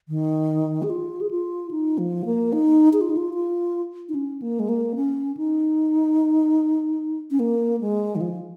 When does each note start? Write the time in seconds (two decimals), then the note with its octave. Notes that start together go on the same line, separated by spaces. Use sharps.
0.09 D#3
0.83 G#4
0.90 F4
1.21 G#4
1.31 F4
1.71 D#4
1.98 F3
2.25 A#3
2.53 D#4
2.93 G#4
3.01 F4
3.10 D#4
3.17 F4
3.34 F4
4.09 D#4
4.14 C#4
4.42 A#3
4.60 G#3
4.69 A#3
4.96 C#4
5.37 D#4
7.31 C#4
7.40 A#3
7.81 G#3
8.16 D#3
8.21 F3